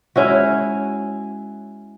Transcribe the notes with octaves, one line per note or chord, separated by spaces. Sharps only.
G#3 C#4 E4 F#4